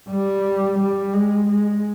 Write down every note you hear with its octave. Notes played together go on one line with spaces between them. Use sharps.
G3
G3
G#3
G#3